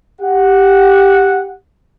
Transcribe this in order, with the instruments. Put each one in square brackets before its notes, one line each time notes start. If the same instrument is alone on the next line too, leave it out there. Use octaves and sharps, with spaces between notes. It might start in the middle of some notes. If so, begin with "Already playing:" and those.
[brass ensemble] G4 F#5